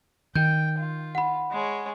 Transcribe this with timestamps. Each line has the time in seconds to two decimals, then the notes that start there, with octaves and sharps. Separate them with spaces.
0.35 D#3 G5 G6
0.78 F4
1.15 F#5 B5
1.51 G#3 C#5